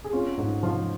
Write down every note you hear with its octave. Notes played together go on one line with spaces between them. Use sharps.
G#4
C#4 F4
G#2 D#4
F3 F4